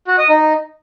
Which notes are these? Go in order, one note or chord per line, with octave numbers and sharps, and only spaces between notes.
F#4
D#5
D#4